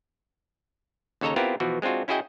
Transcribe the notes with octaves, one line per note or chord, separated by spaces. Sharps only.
D#2 C#3 A4 C#5 D#5 A#5
B3 C4 E4 F4 G4 A#4
B2 E3 F3 F#4
G#3 C4 D4 F4 F#4
C#4 E4 F#4 G#4 D#5 G5